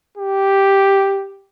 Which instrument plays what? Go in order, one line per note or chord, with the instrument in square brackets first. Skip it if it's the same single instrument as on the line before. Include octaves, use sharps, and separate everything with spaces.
[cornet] G4